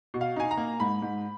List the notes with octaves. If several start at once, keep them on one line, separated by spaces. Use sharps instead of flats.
B2
F5
D#4 G#5
A#5
A#3
G#2 B5
G#2